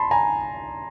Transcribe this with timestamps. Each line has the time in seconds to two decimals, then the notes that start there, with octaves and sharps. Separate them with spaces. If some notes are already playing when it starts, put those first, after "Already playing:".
Already playing: A5 B5 C6
0.11 G#5 A#5